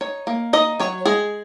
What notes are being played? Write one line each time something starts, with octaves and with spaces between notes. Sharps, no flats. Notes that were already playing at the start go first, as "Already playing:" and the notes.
D#4 C#5
A#3
D#4 D#5
F#3 C#5
G#3 G#4